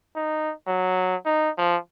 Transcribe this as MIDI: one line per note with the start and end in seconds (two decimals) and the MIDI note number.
0.16 0.53 63
0.67 1.16 54
1.26 1.50 63
1.58 1.77 53